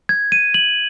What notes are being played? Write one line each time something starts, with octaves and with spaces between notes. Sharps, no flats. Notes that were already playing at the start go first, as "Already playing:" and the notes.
G#6
D#7
F#7